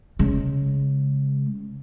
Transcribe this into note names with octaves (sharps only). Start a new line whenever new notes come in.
C#3 G#3